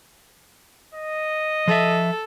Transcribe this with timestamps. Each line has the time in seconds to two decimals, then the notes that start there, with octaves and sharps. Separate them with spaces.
0.94 D#5
1.68 F3 A4 E5